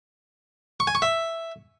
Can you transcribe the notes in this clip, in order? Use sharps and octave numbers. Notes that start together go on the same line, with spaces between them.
C#6
G#5
C#6
E5